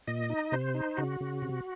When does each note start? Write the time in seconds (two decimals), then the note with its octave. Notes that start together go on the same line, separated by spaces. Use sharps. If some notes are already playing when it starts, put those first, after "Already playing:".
0.08 A#2 D#5
0.30 D#4
0.52 C3 C5
0.74 D#4
0.97 C#3 F#4
1.20 C#3
1.42 C3